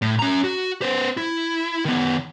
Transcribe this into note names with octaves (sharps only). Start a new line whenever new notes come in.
A2
C#4 A#5
F#4
B3 C5
E4
D#3 B3